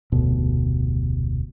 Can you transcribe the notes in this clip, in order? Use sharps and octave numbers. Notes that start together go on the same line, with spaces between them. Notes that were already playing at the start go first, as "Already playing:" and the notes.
F1 D2 B2